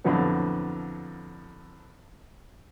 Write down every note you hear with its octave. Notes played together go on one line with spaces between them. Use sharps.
F2 A2 D3 F3 F#3 B3